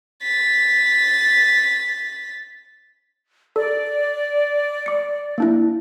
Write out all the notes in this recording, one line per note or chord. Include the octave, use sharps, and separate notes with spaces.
A6 B6
A4 D5
D6 C#7
A#3 D4 E4